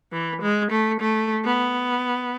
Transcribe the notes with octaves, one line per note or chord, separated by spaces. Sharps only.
E3
G#3
A3
A3
B3